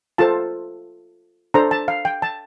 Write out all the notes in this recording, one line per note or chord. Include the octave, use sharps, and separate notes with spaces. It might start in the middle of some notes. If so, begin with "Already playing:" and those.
F4 A4 C5 A5
D4 A4 C5 A#5
A5
F5
G5
A5